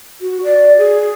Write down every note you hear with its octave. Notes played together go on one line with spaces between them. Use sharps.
F#4
D5
G#4